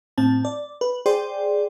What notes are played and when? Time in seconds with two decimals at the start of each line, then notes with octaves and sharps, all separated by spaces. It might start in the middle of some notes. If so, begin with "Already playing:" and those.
0.18 A2 C4 A5
0.45 D5
0.81 B4
1.06 G#4 C5 D5 G5 C6